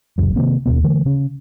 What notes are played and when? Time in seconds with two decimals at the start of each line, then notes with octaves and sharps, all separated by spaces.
0.18 F1 C#2 F#2
0.36 C3 D#3 A#3 C4
0.66 D#2 G#2 B2 B3
0.83 D3 E3 A3
1.05 C#3 C#4